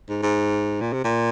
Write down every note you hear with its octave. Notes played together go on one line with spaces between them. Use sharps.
G#2
G#2
A#2
C3
A#2